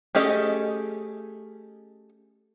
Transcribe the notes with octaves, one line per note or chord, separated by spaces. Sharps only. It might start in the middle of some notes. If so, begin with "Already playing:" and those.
A3 C#4 G4 G#4 D#5